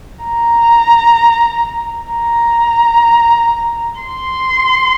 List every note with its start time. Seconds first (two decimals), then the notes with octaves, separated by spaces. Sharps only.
0.25 A#5
2.13 A#5
4.01 C6